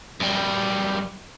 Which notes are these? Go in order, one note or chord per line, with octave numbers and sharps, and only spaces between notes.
F#2 G3